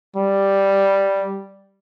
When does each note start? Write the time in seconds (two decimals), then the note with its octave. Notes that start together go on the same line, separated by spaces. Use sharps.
0.16 G3